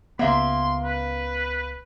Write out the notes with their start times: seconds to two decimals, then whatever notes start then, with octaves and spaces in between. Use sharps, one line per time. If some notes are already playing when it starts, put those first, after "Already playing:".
0.19 C#2 C#3 A#3 B3 E5 C6
0.84 B4